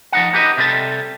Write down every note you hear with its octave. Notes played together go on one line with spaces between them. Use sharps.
F3 D#4 F#5
D#4 G4 B4 D#5
C3 G3 C4 A4